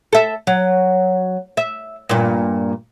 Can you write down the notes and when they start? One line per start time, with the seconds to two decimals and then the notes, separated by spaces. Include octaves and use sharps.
0.13 A4 E5
0.47 F#3
1.57 E5
2.09 G2 A#2